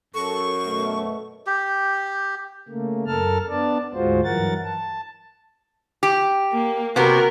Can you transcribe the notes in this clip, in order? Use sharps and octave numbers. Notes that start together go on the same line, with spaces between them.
F#2 A4 C#6
B2 A3
G4
C#3 A3 A#3
F#2 A4 A#4 A5 F6
B3 D4 D5 A5
D2 G#2 G#3 F4 F#4 C5
G2 E3 F#3 A#4 F#5 A6
A5
G4
A#3
C3 B3 F#4 A#4